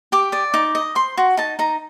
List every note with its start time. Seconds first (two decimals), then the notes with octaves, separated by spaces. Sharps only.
0.12 G4 D6
0.32 D5 D#6
0.54 D#4 D6
0.75 D#5
0.95 C5 C6
1.17 F#4
1.37 D#4 A5
1.59 D#4 A#5